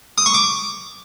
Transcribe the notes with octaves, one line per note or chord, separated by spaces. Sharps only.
D#6
C#6
D6